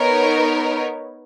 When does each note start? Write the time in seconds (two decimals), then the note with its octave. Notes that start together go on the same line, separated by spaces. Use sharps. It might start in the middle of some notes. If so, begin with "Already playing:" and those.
Already playing: B3 D#4 A#4 C#5